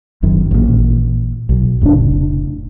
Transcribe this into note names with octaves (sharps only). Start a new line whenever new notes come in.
F#1 F#2 D#3
A1 A#2
B1
F1 A2 C#3 D4